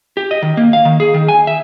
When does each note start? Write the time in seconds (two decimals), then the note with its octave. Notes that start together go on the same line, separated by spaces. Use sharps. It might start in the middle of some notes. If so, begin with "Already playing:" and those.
0.17 G4
0.31 D#5
0.42 D#3
0.57 A#3
0.73 F5
0.85 D#3
1.00 G#4
1.14 D#3
1.28 G#5
1.47 E5